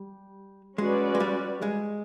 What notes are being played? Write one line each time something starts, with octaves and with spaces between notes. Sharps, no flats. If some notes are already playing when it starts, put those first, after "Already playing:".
Already playing: G3
G#3 C#4 F#4 B4 D5
G#3
G3
G#3